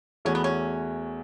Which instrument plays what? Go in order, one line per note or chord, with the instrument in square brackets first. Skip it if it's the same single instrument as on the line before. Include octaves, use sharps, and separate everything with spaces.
[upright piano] E2 E3 A3 F#4 [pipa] C#4
[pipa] B3
C#4